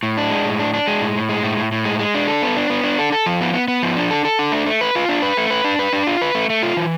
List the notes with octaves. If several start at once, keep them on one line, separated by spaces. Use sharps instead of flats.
A2
D4
G#3
A2
D4
D4
G#3
A2
A2
G#3
A2
A2
A2
G#3
G#3
D4
A4
B3
D4
B3
D4
A4
A4
F3
B3
B3
B3
F3
D4
A4
A4
D4
A3
A3
B4
F4
D4
B4
A3
B4
D4
B4
D4
F4
B4
A3
A3
F4
E3